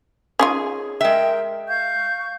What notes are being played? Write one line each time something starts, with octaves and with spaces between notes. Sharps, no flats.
C#4 D#4 F4 G#4
G#3 A#4 E5 G5
F5 C#6 G6